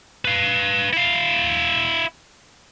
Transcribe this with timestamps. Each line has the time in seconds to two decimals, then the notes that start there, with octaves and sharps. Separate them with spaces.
0.25 B4 F5
0.93 E4 F5